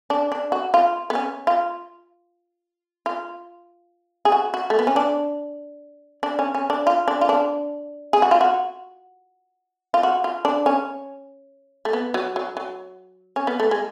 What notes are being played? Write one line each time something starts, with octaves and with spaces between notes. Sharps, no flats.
D4
D4
F#4
F4
B3
C#4
F4
F4
G#4
F#4
F#4
A3
B3
C#4
D4
D4
C#4
C#4
D4
F4
D4
F4
D4
G#4
F#4
F4
F#4
F4
F#4
F4
D4
C#4
A3
B3
F#3
F#3
F#3
C#4
B3
A3
G#3